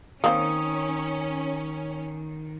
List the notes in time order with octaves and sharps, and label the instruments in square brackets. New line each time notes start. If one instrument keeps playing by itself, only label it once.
[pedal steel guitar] D#3 [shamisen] A#3 C4 [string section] C#4 [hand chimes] D#6